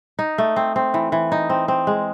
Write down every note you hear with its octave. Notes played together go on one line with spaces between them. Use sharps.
D#4
A3
C4
C4
E3
E3
D#4
C4
C4
G#3